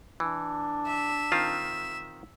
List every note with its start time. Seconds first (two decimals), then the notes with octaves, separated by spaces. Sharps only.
0.20 E3 D4
0.87 E5
1.32 D#3 C4 F4